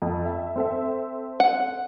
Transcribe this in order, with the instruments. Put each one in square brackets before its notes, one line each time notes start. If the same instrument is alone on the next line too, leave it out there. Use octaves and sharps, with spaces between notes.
[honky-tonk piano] F2
E5
C4 A4 E5
[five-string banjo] F#5